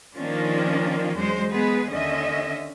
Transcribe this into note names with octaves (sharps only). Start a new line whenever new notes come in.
D#3 F3 A#3 C#4 D4 F4
E2 F#3 G#3 C5
G#3 B3 G#4 B4
D#2 D3 C#4 D#5 E5